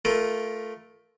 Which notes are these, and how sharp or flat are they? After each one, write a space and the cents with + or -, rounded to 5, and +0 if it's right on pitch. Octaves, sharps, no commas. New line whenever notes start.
A3 +0 F4 +0 A#4 +20